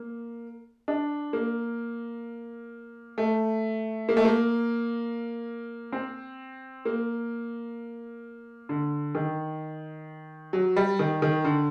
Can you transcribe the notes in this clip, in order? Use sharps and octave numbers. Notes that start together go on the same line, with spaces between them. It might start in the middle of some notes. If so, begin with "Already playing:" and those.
Already playing: A#3
D4
A#3
A3
A#3
A3
A#3
C4
A#3
D3
D#3
F#3
G3
D#3
D#3
D3